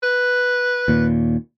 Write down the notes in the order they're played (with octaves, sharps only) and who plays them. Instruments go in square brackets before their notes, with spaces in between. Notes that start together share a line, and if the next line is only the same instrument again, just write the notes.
[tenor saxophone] B4
[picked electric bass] D#2 A#2